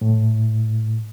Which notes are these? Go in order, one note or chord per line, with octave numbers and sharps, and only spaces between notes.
A2